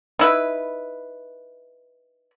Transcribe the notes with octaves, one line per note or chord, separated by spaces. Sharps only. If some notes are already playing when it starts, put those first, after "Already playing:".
D#4 E4 B4